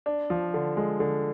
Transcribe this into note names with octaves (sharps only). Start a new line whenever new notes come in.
D4
F3
D3
G#3
D3